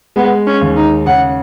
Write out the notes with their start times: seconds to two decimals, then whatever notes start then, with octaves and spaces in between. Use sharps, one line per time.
0.16 G#3 B3
0.47 C#4
0.61 D#2
0.77 D#4
1.06 C#3 F#5